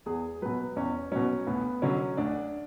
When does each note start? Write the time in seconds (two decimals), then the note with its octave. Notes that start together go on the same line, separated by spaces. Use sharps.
0.06 E2 G#4
0.42 B2 F#3 B4
0.76 E2 C#4
1.11 B2 F#3 C#4
1.47 D2 B3
1.82 D3 F#3 C#4
2.17 D2 D4